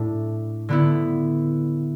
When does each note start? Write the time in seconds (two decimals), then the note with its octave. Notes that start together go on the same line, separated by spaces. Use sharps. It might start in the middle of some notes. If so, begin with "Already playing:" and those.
Already playing: A2 A3 D4
0.69 D3 B3 E4